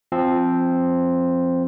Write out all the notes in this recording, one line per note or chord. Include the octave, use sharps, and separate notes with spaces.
F3 C4